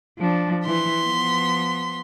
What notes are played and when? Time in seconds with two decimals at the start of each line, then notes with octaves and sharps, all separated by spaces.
0.19 F3 D4
0.66 E3 C6 B6
1.04 F3 B3